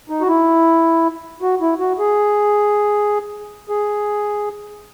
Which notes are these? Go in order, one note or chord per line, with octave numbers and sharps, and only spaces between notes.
D#4
F#4
E4
F#4
E4
F#4
G#4
G#4